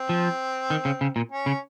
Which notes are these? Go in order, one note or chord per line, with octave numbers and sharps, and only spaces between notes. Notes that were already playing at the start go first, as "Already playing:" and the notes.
Already playing: C4
F3
D#3
C#3
C#3
A#2
C#4
C#3